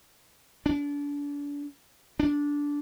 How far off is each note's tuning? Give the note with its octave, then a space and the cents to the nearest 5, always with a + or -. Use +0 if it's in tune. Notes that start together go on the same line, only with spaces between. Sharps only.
D4 -35
D4 -15